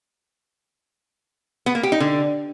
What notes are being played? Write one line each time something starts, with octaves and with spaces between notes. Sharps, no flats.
B3
A#3
G4
D#4
D3